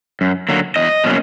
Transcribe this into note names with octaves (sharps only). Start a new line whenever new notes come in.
F#2
D3 F#3 A#3
E2 D#5
B2 F#3 A#3 C#4